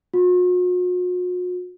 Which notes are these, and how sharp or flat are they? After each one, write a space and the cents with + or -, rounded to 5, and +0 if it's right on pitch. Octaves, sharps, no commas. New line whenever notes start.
F#4 -45